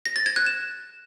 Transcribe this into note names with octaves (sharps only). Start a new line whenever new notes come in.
A#6
A6
G#6
F#6
E7